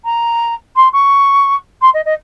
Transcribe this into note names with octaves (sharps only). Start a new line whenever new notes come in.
A#5
C6
C#6
C6
D#5
D#5